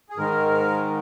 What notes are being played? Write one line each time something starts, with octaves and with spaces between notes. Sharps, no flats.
G#4
G#2 D#3 G#3 A#4